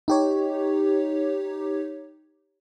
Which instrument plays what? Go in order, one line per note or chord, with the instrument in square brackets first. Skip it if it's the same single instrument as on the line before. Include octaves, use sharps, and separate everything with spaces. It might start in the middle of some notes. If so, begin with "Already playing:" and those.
[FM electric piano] D#4 G4 C#5